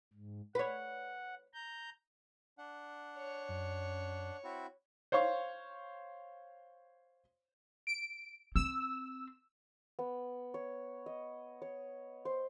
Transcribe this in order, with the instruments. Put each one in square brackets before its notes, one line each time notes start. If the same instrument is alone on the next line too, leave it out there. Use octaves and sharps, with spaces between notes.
[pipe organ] G#2
[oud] B4 C#5 [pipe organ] F#5
[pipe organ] A#5 G6
[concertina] D4 F#5
[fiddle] C#5
[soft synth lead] F#2
[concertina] C4 E4 F#4
[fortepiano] C5 C#5 F5 C#6
[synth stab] D7
[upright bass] C4 [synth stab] E6
[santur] B3
C#5
D#5
C#5
C5